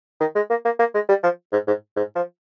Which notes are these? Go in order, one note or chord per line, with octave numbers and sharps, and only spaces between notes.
D#3
G#3
A#3
A#3
A#3
G#3
G3
F3
G#2
G#2
G#2
F3